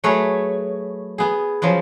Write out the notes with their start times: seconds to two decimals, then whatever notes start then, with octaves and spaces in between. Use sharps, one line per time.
0.04 F#3 A3 G#4 A4 B4 C#5
1.18 B3 G#4
1.62 C#3 F3 F#3 B3